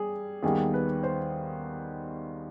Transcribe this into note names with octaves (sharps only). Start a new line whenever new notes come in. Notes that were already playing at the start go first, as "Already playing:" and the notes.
Already playing: G3 G#4
D#2 D#3 G3 B3 G#4
B4
C5